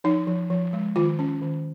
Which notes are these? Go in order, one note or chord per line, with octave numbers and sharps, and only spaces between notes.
F3 D#4
F3
F3
G#3
D#3 F4
C#4
D#3